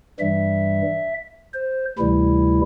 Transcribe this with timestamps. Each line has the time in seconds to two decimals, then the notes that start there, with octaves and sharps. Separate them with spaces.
0.20 G2 E3 G3 E5
1.54 C5
1.98 D2 C3 E3 G3 E4